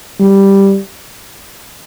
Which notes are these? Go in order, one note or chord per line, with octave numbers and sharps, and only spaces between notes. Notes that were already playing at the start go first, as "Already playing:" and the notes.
G3